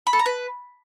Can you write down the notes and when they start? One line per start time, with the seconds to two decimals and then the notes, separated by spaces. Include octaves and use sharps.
0.07 B5
0.13 A4
0.19 A#5
0.26 B4